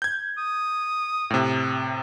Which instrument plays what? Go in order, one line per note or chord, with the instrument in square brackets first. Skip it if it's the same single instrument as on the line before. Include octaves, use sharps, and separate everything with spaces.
[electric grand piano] G6 G#6
[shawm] D#6
[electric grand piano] A2 C3